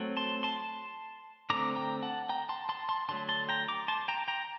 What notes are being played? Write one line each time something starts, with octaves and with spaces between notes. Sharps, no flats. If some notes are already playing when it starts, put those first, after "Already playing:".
Already playing: F#3 A3 C4
A5 C6
A5 C6
D3 A3 C4 A#5 D6
G5 A#5
F#5 A5
G5 A#5
A5 C6
A5 C6
A5 C6
D3 F#3 A3 A5 C6
A5 C6
G5 A#5
A#5 D6
A5 C6
G5 A#5
G5 A#5